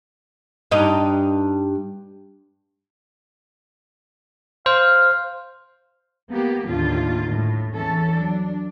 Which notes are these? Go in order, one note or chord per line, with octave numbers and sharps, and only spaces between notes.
G2 D#4
C5 F5
A#3 B3 G4
D#2 A2 D3 F4
A2
E2 E3 C#4 A4
F#3 D4